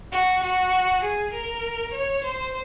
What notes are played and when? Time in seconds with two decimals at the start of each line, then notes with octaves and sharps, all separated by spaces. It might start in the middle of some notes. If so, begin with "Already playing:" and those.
0.12 F#4
0.43 F#4
1.03 G#4
1.33 A#4
1.93 C#5
2.24 C5